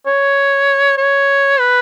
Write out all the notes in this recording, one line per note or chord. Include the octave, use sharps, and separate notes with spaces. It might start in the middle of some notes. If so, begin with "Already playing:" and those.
C#5
C#5
B4